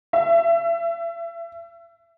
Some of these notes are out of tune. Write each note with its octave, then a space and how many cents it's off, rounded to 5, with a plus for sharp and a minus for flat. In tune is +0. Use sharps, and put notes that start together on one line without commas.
E5 +25